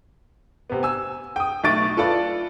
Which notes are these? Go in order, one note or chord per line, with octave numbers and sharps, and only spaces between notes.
C3 B3
G#5 E6
G5 D#6
B1 A3 C#6 A6 D7
F4 A4 B4 D5